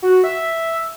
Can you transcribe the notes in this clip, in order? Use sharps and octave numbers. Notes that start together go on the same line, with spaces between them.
F#4
E5